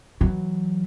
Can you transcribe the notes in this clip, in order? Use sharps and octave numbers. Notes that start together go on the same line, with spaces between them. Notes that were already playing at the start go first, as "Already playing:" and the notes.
E3 F#3